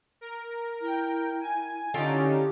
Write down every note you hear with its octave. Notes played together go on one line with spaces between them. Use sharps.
A#4
E4 A#4 G5
G#5
D3 C#4 D#4 F4 G4 A4